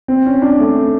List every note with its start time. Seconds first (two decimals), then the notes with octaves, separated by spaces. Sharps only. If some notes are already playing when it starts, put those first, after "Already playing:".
0.08 C4
0.26 C#4
0.42 D4
0.60 A3